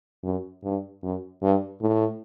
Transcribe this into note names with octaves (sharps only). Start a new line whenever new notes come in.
F#2
G2
F#2
G2
A2